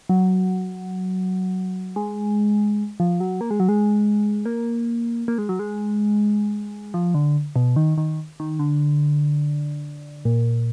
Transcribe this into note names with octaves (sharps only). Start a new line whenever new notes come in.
F#3
G#3
F3
F#3
A#3
G#3
F#3
G#3
A#3
A#3
G#3
F#3
G#3
F3
D3
B2
D#3
D#3
D#3
D3
A#2